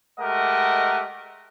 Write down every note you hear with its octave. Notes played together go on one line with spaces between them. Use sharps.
G#3 A3 G4 A#4 D#5 F#5